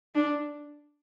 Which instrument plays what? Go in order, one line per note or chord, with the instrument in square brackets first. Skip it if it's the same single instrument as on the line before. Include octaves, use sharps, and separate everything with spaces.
[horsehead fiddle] D4